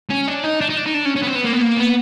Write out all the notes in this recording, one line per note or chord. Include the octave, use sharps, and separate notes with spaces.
C#4
D4
D#4
D4
D#4
D4
D#4
D4
C#4
C#4
B3
C4
B3
A#3
B3
A#3
B3